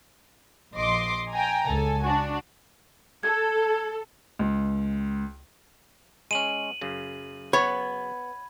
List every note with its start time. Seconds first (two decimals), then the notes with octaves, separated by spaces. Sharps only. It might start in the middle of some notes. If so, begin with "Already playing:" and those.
0.77 A#1 F3 D#5 C6 D6
1.32 G5 G#5 A#5
1.66 C#2 A4 G#5
2.04 D4 F#4
3.23 A4 G#6
4.39 C#2
6.31 G#3 C#4 D#7 F#7
6.81 F#2 C#3
7.53 B3 C#5 B5 G#6